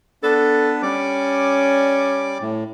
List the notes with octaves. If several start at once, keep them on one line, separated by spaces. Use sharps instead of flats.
B3 D4 A4 B4
G3 C#4 D5 D6
A2